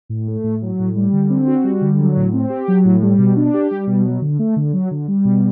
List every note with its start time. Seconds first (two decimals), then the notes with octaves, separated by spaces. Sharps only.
0.09 A2
0.28 A3
0.44 A2
0.62 F#3
0.79 A2
0.96 G3
1.13 D3
1.30 C4
1.47 F#4
1.64 G3
1.81 D3
1.99 F#3
2.16 A2
2.33 C4
2.50 G4
2.68 F#3
2.85 A2
3.02 G3
3.18 B2
3.36 D4
3.54 G4
3.71 G3
3.87 B2
4.05 F#3
4.22 D3
4.39 A3
4.56 D3
4.73 F#3
4.91 D3
5.08 G3
5.25 B2